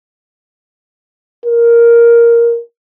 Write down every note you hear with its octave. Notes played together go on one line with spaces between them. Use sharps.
A#4